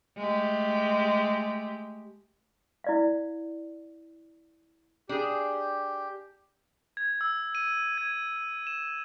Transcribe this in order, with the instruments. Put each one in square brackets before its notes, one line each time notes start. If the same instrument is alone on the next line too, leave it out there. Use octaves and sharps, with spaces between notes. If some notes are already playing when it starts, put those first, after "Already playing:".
[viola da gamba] G#3 A3 G4
[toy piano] E4 D5 F5
[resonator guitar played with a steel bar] D4 G#4 [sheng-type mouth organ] G4
[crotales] G#6
E6
D#7
G#6
E6
E7